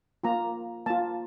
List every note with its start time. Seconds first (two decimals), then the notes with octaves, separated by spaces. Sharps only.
0.23 A#3 F4 A#5
0.86 A#3 F4 A5